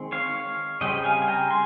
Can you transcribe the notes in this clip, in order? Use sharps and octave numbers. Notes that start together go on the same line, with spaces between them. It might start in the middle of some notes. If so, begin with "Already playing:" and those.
Already playing: D#3 G#3 C4
C#5 F5
C#3 G3 C4 D#5 G5
F5 G#5
G#5
G5 A#5
G#5 C6